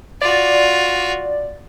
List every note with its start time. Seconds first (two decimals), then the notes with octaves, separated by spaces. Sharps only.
0.21 F4 F#4 D5